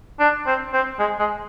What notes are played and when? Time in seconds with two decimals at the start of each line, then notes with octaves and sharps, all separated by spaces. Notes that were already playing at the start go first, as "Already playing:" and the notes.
0.19 D4
0.46 C4
0.73 C4
0.99 G#3
1.19 G#3